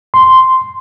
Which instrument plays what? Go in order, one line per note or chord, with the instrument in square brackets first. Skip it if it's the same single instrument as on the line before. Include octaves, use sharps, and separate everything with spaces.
[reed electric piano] C6